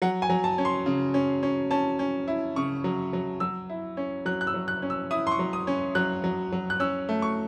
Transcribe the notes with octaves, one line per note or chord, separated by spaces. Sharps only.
F#3 F#5
G#5
F#3
A5
C#4
C6
C#3
C#4
C#4
C#4 A5
C#4
E4
C#3 C#6
F#3
F#3
F#3 E6
E4
C#4
F#3 F#6
F#6
E6
F#3
F#6
C#4
E6
E4 D#6
C6
C#6
F#3
D#6
C#4
F#3 F#6
F#3
F#3
F#6
C#4 E6
A3
C#6